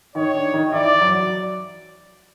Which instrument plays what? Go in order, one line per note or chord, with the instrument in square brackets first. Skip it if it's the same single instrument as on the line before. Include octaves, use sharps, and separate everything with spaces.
[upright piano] D#3 D#4 [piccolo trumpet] C#5
[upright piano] D4
D#3 D#4
[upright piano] E3 E4 [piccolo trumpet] D5
[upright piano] F#3 F#4